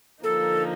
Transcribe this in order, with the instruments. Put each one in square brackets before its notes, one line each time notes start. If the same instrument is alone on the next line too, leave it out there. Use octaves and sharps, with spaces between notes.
[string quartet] D3 F3 A#3 D#4 [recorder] A4